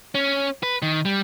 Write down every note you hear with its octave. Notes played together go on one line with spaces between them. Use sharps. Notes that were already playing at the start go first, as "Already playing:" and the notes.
C#4
B4
D#3
G3